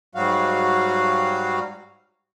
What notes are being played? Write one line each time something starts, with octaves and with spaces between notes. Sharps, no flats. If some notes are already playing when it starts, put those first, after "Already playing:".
G#2 F#3 G3 F#4 F5